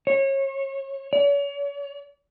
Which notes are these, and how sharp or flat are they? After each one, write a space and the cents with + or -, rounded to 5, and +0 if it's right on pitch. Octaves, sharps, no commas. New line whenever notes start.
C#5 -30
C#5 +40